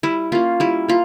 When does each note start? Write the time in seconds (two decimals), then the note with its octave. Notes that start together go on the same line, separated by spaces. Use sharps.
0.03 G3 E4
0.32 A#3 C#4 F4
0.60 G3 E4
0.88 A#3 F4